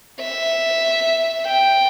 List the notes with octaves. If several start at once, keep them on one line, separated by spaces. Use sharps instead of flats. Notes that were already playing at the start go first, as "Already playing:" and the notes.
E5
G5